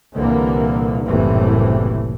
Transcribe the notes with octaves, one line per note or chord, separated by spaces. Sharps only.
C2 A#2 D3 E3 A#3
F#1 C2 A2 C3 E3